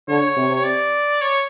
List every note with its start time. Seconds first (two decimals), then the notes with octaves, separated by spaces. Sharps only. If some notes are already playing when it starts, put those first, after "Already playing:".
0.08 D3 C#5
0.37 C3
0.55 C#5
0.64 D5
1.22 C#5